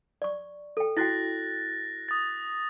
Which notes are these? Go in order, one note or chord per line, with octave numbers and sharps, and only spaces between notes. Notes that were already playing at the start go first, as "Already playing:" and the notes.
D5 C#6
A4 G5
E4 F#4 G5 F#6 A6 A#6
D#6 A6